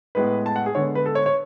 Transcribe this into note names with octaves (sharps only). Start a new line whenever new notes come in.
A2 G#3 B3 B4
A5
F#5
G#4
D3 G#3 B3 C#5
B4
A4
C#5
C#5